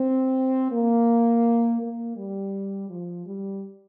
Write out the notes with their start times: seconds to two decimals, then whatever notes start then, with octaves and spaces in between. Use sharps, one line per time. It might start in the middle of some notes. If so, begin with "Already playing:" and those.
Already playing: C4
0.72 A#3
1.81 A#3
2.16 G3
2.89 F3
3.26 G3